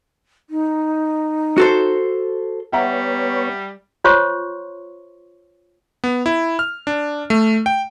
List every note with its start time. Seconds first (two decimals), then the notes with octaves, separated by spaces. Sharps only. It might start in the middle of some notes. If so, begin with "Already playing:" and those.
0.50 D#4
1.58 F#4 A4 C5
2.73 G3 B3 C#5 E5 F#5 A#5
4.04 F4 C5 C#5 C6 C#6
6.04 B3
6.26 E4
6.59 F6
6.87 D4
7.30 A3
7.66 G5